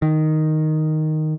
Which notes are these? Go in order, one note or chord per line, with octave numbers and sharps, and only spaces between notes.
D#3